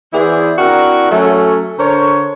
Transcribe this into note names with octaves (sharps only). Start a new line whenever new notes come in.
E3 B3 E4 G#4 C5 D5
C4 D4 E4 F#4 A#4
F#3 A3 C#4
D3 A#4 C5 C#5